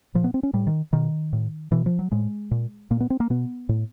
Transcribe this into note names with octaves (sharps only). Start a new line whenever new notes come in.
A#2 F3
B3
C4
C#4
A2 G3
D#3
B2 D#3
A2
B2 E3
F3
F#3
A2 G#3
A#2
A#2 A#3
B3
C4
A#3
B2 B3
A2